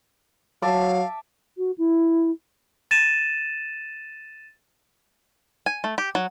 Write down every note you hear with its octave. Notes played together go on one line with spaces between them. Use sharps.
F#3 E5 F5 A5 D6
F#4
E4
A6 D#7 E7
G#5
A3
G4
F#3